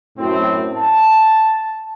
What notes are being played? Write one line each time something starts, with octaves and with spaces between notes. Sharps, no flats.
F#2 A2 C4
A5